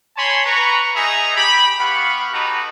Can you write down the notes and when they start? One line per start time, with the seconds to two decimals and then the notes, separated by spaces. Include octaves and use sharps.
0.17 C#5 G#5 A5 B5 C6
0.46 B4 A#5 C#6
0.96 D#4 G#4 E5 G#5 A#5
1.36 G4 B5
1.79 B3 G4 F5 F#5 B5 C#6
2.33 D#4 F#4 G4 A4 B4 A#5